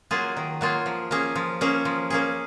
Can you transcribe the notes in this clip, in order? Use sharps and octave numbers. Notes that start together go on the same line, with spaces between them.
F#3 A#3 F4 G#4
D#3
F#3 A#3 F4 G#4
F3
A#3 C#4 G#4
F3
A#3 C#4 G#4
F3
A#3 C#4 G#4